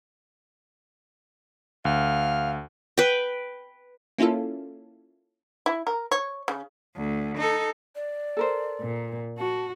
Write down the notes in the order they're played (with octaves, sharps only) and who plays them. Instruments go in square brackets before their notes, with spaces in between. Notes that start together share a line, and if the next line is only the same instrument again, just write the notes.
[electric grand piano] D2 [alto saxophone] F5
[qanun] B4 G5
[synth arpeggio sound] A#3 C#4 E4 F4 A4
[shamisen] E4
A#4
C#5
C#3
[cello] D2
D#4 A4
[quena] D5
[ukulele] A4 A#4 C5
[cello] A#2
[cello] F#4 [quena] A5